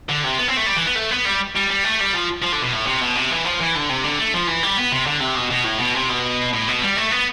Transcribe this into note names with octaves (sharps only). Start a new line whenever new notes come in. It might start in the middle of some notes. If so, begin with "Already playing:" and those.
D3
C3
B3
C4
A3
G3
E3
B3
A3
B3
G3
G3
G3
A3
G3
F3
F3
D3
B2
A2
C3
B2
C3
E3
F3
E3
D3
C3
D3
A3
F3
E3
G3
B3
C3
D3
C3
B2
B2
A2
B2
C3
B2
A2
B2
G3
A3
B3